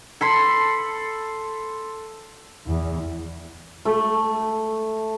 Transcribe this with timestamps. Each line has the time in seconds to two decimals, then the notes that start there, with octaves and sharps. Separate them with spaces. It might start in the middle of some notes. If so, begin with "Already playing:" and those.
0.21 A4 B5 C6
2.66 E2
3.85 A3